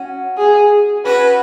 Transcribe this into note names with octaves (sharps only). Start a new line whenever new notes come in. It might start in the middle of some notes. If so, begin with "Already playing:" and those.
Already playing: C#4 F#4
G#4
C#4 F#4 B4